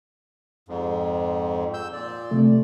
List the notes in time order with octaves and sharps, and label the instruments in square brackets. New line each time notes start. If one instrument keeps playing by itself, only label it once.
[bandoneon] F2 G#2
E6 G6
A#2 D5
[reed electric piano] C3 A3